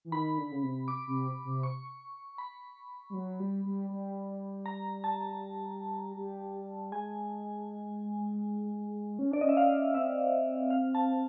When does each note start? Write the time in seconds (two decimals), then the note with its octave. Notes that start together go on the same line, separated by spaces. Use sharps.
0.05 E3
0.12 D#3 B5
0.38 D3
0.51 C#3
0.63 C3
0.88 D6
1.07 C3
1.45 C3
1.63 C#6
2.38 B5
3.10 G3
3.14 F#3
3.40 G3
3.65 G3
3.90 G3
4.66 A#5
5.04 A5
6.17 G3
6.92 G#3 G#5
9.19 C#4
9.31 D4 D5
9.41 C#4 D#5
9.49 E5
9.57 F5
9.94 C4 E5
10.70 F5
10.95 A5